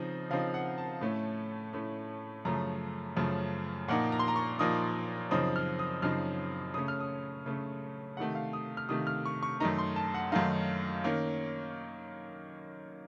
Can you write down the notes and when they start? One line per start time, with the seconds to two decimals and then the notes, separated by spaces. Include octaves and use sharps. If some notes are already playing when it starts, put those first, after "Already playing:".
Already playing: C#3 F3 C4 D#4
0.30 C#3 F3 C4 D#4 F5
0.54 F#5
0.78 A5
1.01 A2 A3 C#4
1.73 A2 A3 C#4
2.45 F#2 C#3 F3 A3 A#5
3.16 F#2 C#3 F3 A3
3.88 A#2 F3 A#3 D#4 F#5
4.12 A#5
4.19 C6
4.28 A#5
4.36 C#6
4.59 A#2 F3 A#3 D#4 D#6
5.31 F#2 C#3 F3 C4 D#4 D#6
5.56 F6
5.79 D#6
6.02 F#2 C#3 F3 C4 D#4 F6
6.74 C#3 A3 C#4 D#6
6.88 F6
7.00 D#6
7.46 C#3 A3 C#4
8.17 C3 D#3 A3 F#5
8.35 F5
8.53 D#6
8.77 F6
8.89 C3 D#3 A3 D#6
9.07 F6
9.25 C#6
9.43 C#6
9.60 F#2 D#3 A3 D#4 A#5
9.78 C6
9.96 A5
10.14 F#5
10.32 F#2 D#3 A3 D#4 F5
11.04 D#3 A#3 C#4